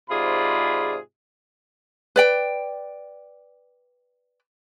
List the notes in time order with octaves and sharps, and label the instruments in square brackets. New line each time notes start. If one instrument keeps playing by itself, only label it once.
[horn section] G#2 C3 F4 G#4 D5 B5
[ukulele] B4 D5 G5